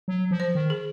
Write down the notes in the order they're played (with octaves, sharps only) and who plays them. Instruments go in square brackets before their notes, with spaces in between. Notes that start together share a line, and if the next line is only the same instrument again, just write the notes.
[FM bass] F#3
F3
[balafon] C5
[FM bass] D#3
[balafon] G#4